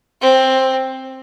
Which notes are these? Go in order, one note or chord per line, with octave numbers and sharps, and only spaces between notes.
C4